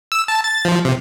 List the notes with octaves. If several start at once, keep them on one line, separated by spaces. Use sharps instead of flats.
E6
A5
A6
F3
C3